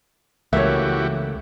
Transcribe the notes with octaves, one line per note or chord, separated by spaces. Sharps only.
C#2 E3 A3 A#3 F#4 G4 C#5 E5